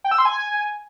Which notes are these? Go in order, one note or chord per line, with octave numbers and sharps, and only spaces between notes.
G5
E6
C6
G#5